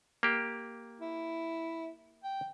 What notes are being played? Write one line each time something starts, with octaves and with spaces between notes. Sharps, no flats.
A#3 G4
E4
G5